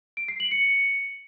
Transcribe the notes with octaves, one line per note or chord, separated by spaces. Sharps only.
D7
C7
F#7
C#7